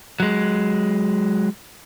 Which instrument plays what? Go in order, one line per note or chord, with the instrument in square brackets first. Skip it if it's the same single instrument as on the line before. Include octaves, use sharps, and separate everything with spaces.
[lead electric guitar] F#3 G#3